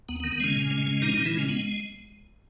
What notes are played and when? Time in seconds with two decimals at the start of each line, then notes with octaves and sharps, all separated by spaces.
0.09 D#2 B3
0.20 B3
0.24 D#3
0.32 B3
0.40 C#3 G#3 C#4
0.55 A#2
0.71 G#3
0.87 G#3
1.02 A#2 D#3 D#4
1.08 C#4
1.14 A#2 D#3 D#4
1.25 E3 E4
1.34 C#3 G#3 C#4
1.49 G#3 B3